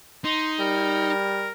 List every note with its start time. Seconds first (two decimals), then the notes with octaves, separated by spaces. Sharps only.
0.25 D#4 C6
0.60 G3 A#4